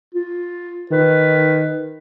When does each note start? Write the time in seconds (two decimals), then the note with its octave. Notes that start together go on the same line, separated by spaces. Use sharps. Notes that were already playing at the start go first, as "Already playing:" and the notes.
0.15 F4
0.91 D#3 B4